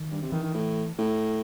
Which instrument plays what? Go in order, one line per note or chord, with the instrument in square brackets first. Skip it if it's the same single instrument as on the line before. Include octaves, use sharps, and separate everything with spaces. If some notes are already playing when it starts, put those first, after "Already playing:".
Already playing: [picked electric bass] D#3
[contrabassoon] G2
C3
[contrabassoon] D#3 [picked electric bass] E3
[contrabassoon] D#3
A2
A2